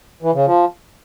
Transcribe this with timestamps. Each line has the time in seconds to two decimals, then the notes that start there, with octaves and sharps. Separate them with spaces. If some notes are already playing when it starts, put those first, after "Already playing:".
0.22 E3
0.34 C#3
0.45 F3